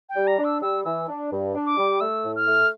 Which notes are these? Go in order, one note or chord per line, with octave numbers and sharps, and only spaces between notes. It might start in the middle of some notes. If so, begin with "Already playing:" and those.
G5
G3
A#5
D4
E6
G3 E6
E3 E6
D4
G2
D4
D6
G3
A3 E6
A2
F6
A3